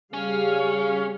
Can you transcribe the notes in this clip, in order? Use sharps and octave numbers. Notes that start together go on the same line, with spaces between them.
C#3 G3 C#4 G#4 F5